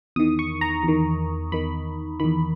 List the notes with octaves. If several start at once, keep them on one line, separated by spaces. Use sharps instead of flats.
E2 D#3 D#6
C#6
A#5
E2 D#3
E2 D#3 B5
E2 D#3 B5